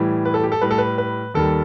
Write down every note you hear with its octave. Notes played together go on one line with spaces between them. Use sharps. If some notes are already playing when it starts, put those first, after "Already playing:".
Already playing: A2 E3 G3
B4
A4
G4
A4
A2 G3 B4
A4
B4
B4
D#2 D#3 G3 A4